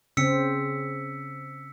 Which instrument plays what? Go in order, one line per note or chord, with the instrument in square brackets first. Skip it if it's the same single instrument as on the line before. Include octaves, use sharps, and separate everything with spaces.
[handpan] C#3 C4 [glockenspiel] E6 B6 C#7